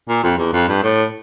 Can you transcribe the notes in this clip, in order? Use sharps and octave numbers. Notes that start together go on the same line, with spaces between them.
A#2
F2
E2
F2
G2
A2